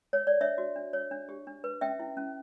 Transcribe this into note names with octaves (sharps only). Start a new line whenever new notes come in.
C#5
D5
D4 C#5 E5
F#4
D4
C#5
D4
G4
D4
B4
C#4 E5 G5
E4
C#4